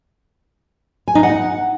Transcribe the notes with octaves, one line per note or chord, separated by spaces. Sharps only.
G#5
D#4
F#5